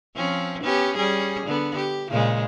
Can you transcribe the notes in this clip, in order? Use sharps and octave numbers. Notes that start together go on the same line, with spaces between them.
F3 C4 C#4
B3 C#4 G4
G3 C#4 G#4
D3 B3
G4
A#2 C#3 G#3